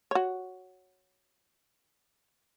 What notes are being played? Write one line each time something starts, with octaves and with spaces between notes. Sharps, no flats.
F#4 C#5